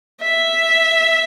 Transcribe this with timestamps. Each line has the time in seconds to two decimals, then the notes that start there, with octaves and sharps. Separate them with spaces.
0.21 E5